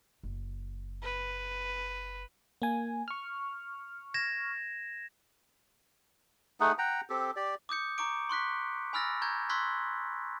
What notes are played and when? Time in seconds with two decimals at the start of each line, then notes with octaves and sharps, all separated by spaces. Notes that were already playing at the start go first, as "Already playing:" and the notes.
0.23 F#1
1.03 B4
2.62 A#3 G#5
3.08 C#6 F6
4.14 G#6 A#6 E7
6.60 A3 D#4 G#4 F#5
6.78 F#5 G5 A#5
7.10 C4 G4 A4
7.36 G4 D5
7.69 D6 D#6 G6 C#7
7.98 A#5 C#6 D6 D7
8.29 C6 C#6 F#6 B6
8.93 G#5 B5 E6 F6 A6 A#6
9.22 A#5 C#6 G6 G#6
9.49 C6 C#6 E6 F#6 G#6 B6